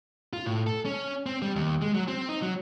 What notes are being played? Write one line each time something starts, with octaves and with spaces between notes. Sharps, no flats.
F4
A2
A4
C#4
C4
G3
D#2
G#3
F#3
C4
D#4
F#3